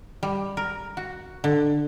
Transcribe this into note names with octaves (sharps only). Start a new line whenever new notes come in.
G3
A#4
F#4
D3